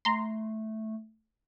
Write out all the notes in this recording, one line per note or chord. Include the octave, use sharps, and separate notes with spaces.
A3 A#5 C6